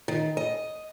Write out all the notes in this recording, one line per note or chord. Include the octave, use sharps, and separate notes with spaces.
D#3
D#5